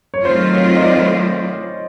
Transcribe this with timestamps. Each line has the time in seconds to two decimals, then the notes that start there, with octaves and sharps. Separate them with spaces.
0.14 C#5
0.25 D#3 F#3 A3 C4 F4 C5
0.54 C#5
0.77 D#5
0.84 D5